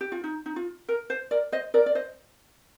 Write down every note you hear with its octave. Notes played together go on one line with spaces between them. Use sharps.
G4
F4
D#4
D#4
F4
A#4
C5
A#4 D5
C5 D#5
A#4 D5
D5
C5 D#5